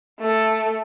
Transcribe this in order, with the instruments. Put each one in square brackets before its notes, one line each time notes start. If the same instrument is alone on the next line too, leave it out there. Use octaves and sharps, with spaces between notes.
[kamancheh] A3 A4